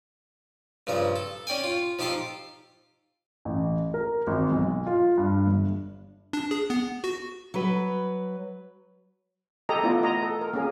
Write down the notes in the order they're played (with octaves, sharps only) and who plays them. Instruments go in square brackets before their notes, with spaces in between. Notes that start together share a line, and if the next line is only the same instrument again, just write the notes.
[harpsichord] G2 C#3 F3 A#5
A4
C#4 D5 G5 G#5
F4
F3 D#4 G4 A4 C6 D6
[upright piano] A1
A#4
G#1
B1
F4
G2
G1
[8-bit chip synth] D4
G#4
B3
F#4
[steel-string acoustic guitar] F#3 B4
[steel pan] G4 A4 D#5 A#5
A3 B3 E4 F4 D5
D#5 A#5
A4
A#4
A#3 C#4 G#4